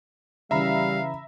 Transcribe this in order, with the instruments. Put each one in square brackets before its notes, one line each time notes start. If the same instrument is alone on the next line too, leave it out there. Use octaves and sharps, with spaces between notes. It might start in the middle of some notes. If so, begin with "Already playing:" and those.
[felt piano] C#3 E3 [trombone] G3 [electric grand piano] E5 A#5 B5 [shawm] F5